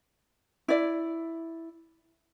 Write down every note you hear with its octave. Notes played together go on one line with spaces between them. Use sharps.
E4 D5